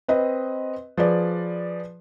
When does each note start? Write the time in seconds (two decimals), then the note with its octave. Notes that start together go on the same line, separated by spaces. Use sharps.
0.08 C4 B4 D#5
0.97 F3 G#4 B4 D5